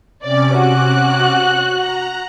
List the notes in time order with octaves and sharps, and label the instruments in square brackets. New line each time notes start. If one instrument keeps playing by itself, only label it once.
[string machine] C3 C#4 D6 [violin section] D5
[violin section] F#4 F#6
[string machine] A#5